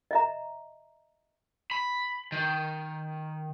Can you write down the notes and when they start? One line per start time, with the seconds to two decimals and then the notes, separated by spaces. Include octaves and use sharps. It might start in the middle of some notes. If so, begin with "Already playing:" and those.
0.11 D#5 E5 A#5
1.71 B5
2.32 D#3